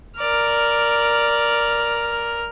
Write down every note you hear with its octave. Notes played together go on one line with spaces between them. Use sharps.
A#4 D5 F6